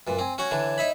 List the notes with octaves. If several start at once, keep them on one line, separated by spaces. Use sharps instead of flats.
F#2 A#2 B4
C4 G#5
C#4 F#4 C#5 F#5
D3 E3 D4
D#4 E5 B5